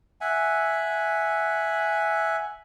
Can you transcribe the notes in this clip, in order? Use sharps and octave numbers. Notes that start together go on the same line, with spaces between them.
E5 F#5 G#5